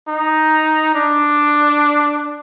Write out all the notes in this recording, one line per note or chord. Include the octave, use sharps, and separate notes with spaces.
D#4
D4